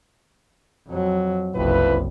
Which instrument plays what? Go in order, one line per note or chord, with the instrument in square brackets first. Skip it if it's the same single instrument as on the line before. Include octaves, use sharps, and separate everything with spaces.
[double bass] F2 F#3
[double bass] F#1 C2 [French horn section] F2 E4 B4